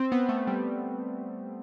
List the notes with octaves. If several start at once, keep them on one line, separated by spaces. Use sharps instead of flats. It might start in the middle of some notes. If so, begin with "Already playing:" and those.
Already playing: C4
B3
A3
G3